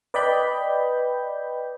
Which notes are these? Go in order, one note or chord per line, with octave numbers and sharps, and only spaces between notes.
B4 D5 D#5 G5 B5 G6